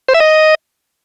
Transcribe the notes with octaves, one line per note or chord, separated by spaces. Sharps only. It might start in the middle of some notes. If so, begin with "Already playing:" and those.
C5
E5
D#5